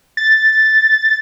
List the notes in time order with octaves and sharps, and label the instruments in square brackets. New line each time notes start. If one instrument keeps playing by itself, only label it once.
[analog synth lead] A6